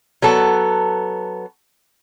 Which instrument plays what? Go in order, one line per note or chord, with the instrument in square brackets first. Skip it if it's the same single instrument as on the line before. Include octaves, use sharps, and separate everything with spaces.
[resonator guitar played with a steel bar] F#3 B3 A4